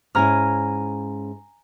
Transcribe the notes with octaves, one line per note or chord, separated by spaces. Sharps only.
G#2 C#4 E4 G#5 A#5 F6